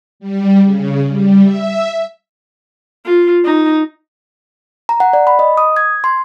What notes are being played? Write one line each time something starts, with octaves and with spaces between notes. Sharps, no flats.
G3
C#3
G3
E5
F4
D#4
A#5
F#5
D5
B5
D#5
D#6
G#6
C6